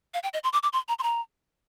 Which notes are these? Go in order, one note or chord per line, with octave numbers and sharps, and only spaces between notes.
F5
G5
D#5
C6
D6
D6
C6
A#5
C6
A#5